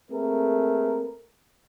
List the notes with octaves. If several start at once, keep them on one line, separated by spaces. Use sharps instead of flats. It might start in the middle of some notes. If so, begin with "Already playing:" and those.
A3 A#3 C4 G#4 A#4 B4